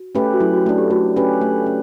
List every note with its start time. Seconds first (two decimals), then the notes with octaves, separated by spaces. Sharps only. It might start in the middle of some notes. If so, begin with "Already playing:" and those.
Already playing: F#4
0.15 A3 C#4 G4 B4
0.33 F#4
0.40 F#3 E4
0.54 F#4
0.66 A3 D4 A4
0.78 G4
0.91 A3 F#4
1.16 C#4 G4 B4
1.41 A3
1.66 C#4